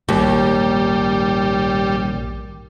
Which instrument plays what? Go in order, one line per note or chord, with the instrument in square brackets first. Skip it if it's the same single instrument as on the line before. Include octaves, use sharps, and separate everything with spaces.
[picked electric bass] A#1 G#2 [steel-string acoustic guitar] D#2 [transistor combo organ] G3